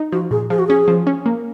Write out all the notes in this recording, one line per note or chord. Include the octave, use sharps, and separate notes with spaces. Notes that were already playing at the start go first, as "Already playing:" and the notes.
Already playing: D#4
F3 F#4
A#2 G#4
F3 G#4
F#4
C#4 G#4
F3
C#4
A#3